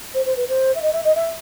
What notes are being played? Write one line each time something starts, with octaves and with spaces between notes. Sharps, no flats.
C5
C5
B4
C5
E5
D#5
E5
D#5
E5